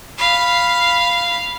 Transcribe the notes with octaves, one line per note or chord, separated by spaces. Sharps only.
F5 B5